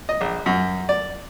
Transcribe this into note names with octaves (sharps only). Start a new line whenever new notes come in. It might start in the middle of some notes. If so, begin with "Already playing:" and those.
D#5
A#1
F#2
D5